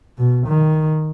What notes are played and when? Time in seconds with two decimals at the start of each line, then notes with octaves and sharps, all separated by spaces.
0.18 B2
0.47 D#3